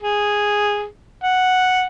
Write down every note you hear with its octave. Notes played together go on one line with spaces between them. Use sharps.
G#4
F#5